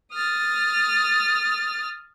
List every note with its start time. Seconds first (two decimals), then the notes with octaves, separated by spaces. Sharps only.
0.12 D#6 F6 A6